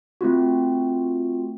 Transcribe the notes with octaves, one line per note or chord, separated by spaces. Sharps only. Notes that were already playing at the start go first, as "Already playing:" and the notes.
A3 C4 F4 F#4